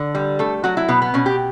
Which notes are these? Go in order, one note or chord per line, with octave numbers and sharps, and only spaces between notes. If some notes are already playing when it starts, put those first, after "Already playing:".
Already playing: D3 A4
G3
A3 A4
F#3 F#4
E4
B2 B3
B3
B2 C#4
G4